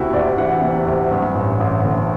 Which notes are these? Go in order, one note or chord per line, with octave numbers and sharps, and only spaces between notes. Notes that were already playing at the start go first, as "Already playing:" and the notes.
Already playing: D2 C3 E4 F#4 G4
D2 D5
E3 F#5
C3
D2
G2
A1
A1
D3